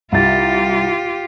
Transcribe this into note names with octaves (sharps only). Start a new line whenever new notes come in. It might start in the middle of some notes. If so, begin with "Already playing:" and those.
C2 F4 G4 A6